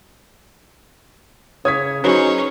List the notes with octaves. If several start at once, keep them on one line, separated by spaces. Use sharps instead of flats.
C#3 C#5 D#6 G#6 B6
F#3 C#4 D#4 G#4 B4 C5